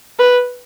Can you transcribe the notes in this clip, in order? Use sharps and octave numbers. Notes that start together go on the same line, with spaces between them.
B4